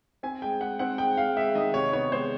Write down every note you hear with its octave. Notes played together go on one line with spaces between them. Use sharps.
C4 G#5
G#3 G5
G#3 F#5
C4 F#5
G#3 G5
G#3 F5
G#3 E5
D#3 D#5
C3 C#5
B3 C#5
G#3 C5